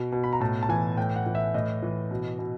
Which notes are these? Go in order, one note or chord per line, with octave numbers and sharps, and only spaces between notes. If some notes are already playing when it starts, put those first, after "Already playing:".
Already playing: B2
B2
B5
A#5
A2 A5
A5
E3 G#5
A2 G5
F#5
E3
E5
A2 D#5
E3
B2
B2